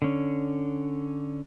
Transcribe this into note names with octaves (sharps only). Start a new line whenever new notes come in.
D3 C#4